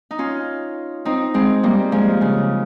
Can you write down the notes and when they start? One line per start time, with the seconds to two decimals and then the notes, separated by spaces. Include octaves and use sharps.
0.11 D#4
0.19 C#4 F4
1.05 C4 D#4
1.34 G#3 C4
1.63 G3 A#3
1.92 F3 G#3
2.21 C#3